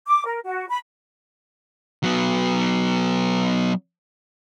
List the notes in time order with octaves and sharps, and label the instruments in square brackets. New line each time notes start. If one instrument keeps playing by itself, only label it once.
[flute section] D6
A#4
F#4
B5
[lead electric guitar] F#3 B3